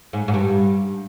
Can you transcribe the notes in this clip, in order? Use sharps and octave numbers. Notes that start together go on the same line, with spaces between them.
G#2
G#2
G2